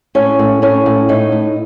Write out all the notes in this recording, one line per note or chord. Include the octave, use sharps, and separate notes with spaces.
A2 C#4
A2
A2 C#4
A2
A2 D#4
A2